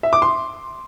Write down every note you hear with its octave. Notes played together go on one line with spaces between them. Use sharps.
E5
D6
C6